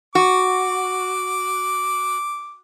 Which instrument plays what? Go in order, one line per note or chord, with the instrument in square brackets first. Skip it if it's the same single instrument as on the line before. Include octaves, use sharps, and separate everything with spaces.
[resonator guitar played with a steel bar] F#4 [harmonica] D6